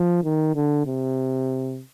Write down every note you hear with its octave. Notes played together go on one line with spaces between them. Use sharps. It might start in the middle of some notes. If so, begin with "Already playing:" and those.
Already playing: F3
D#3
D3
C3